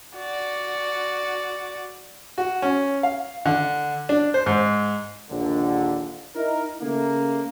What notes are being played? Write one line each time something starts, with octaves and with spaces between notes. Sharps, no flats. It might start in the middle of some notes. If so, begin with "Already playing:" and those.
F#4 D5
F#4
C#4
F5
D3
D4
C5
G#2
A#1 D#2 D3
D#4 E4 A#4
C#3 A3 A#3